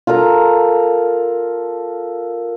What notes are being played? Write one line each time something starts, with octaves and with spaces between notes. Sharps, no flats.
F4 A4 A#4 A#5